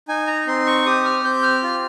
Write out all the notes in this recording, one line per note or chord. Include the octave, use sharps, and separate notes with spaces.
D#4 G#5
A#5
C4 C6
C#6
G4 D#6
F6
C4 G6
F6
F4